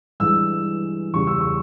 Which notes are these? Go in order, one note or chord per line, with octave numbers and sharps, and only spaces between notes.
G2 E3 G#3 E6
E2 C#3 G3 C#6
E6
C#6